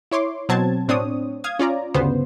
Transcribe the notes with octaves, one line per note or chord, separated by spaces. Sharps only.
E4 C#5 C6 D6
B2 F#3 C4 A5 G#6
A2 C4 D4 C#5 D#6
F5 D#6 G#6
C#4 F4 D5 A#5
D2 G2 C#3 B3 C5